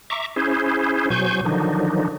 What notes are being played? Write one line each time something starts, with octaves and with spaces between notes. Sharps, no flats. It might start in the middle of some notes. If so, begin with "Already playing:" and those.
E5 A#5 C#6 D6
C#4 E4 G#4 C5
B2 F#3 C5 G#5 C#6 G6
D3 D#3 F3 F#3 D4 D#4